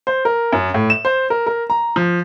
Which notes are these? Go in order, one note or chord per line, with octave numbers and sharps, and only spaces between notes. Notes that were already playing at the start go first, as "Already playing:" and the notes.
C5
A#4
F#2
A2
E7
C5
A#4
A#4
A#5
F3